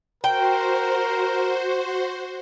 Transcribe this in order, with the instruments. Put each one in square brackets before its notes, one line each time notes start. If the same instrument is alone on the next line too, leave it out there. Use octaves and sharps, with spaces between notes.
[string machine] F#4 C5 [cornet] A#4 [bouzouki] G5